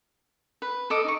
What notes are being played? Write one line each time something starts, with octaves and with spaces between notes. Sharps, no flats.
B4
A4 D#5 D6 D#6
D#4 C#6